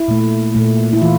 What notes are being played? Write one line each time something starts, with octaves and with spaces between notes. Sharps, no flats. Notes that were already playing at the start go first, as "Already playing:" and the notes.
Already playing: E4
A#2 A3
A#2 A3
E4
E3 F4